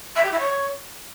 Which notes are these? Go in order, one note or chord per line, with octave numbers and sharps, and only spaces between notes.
E5
G4
E4
C#5